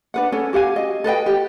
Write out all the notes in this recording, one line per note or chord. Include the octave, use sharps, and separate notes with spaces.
D4 B4 F#5
C#4 A4 G#5
F#4 G4 F5 G#5
D#5
A4 B4 D#5 G5
G4